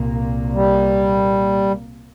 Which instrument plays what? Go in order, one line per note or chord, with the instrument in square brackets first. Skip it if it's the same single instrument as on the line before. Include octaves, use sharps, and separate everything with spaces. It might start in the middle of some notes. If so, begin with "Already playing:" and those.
Already playing: [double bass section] C2 A#2 A#3
[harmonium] G3